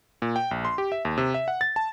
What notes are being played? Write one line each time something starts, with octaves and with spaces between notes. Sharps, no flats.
A#2
G5
A#1
C6
G4
E5
D#2
C3
E5
F#5
A6
A5